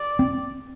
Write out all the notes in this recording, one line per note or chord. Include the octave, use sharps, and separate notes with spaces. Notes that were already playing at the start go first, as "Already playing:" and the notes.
Already playing: D5
C4